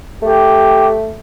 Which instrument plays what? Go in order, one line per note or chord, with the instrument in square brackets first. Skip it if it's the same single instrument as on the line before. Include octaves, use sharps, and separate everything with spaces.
[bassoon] A3 [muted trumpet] G4